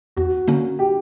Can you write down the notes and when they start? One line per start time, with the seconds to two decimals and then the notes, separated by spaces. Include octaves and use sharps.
0.17 E2 F#4
0.48 D3 A#3 C#4
0.79 G4